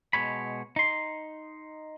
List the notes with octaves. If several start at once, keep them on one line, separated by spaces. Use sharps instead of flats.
B2 G#3 C#5 B5
D#4 C6